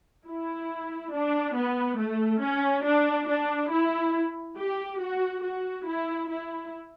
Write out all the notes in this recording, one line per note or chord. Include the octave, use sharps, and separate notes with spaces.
E4
D4
B3
A3
C#4
D4
D4
E4
G4
F#4
F#4
E4
E4